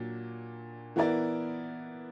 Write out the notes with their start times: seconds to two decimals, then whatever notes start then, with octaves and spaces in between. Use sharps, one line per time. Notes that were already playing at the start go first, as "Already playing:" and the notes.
Already playing: A#2 F#3 A#3 D4
0.96 E3 B3 E4 A#4 D5